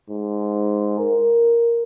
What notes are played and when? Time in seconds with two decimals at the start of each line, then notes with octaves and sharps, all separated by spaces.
0.10 G#2
0.99 A#4